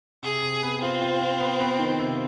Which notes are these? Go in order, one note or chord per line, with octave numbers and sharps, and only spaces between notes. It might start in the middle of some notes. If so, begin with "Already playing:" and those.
C3 G#4
C3
B3
C4 F4
F4
F4
B3
B3
D#3
C3